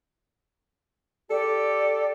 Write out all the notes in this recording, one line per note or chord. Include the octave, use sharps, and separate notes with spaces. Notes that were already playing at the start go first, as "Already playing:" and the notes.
G4 A4 D5